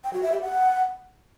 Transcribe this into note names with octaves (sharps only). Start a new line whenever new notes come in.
G5
F#4
E5
G4
F#5